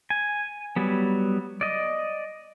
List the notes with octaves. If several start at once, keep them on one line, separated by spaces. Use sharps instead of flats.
G#5
F#3 G3 B3
D5 D#5